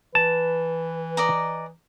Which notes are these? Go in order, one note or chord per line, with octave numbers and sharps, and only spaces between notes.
E3 B4 A5
D5 D#5 A#5